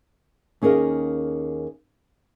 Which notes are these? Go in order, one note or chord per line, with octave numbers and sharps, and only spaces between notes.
D#2 C#4 G#4 A#4 D#5 F5